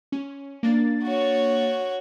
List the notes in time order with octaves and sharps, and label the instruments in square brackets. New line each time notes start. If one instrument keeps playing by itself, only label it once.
[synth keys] C#4
A#3 D4 A6
[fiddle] F#4 C#5